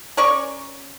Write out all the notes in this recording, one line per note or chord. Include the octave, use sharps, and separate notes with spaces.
C#4 A#4 D5 C#6